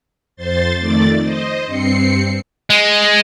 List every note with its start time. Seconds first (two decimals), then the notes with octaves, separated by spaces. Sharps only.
0.36 F2 C5 C6 A6
0.78 F2 D#3 A3 D5 A6
1.21 C5 D#5
1.65 G2 C4 C7 C#7
2.70 G#3